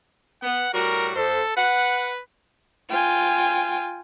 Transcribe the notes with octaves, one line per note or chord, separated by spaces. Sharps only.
B3 F#5
A2 G3 F#4 A#4
F2 A4 C5
B4 F#5
F4 G5 G#5